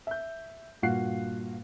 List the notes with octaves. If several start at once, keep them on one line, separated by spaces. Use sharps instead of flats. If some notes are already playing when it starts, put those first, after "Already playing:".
E5 G6
G2 A#2 F#4 F5 F#6 C7